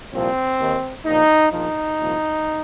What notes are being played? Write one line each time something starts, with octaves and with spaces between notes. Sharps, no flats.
C2 A#2 F3 C4
D#2 D#3
A#1 A#2 F3 D#4
A#1 A#2 F3 D#4
C2 A#2 F3